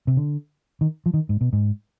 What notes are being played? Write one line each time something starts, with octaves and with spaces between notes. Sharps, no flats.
C3
D3
D#3
F3
D#3
G#2
B2
G#2